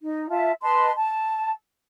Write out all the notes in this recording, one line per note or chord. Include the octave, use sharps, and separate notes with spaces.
D#4
F4 E5 A5
B4 D#5 A5 C6
A5